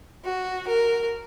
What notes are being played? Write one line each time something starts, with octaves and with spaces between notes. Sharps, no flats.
F#4
A#4